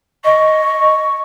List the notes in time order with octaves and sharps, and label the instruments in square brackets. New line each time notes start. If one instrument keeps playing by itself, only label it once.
[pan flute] D#5 [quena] C#6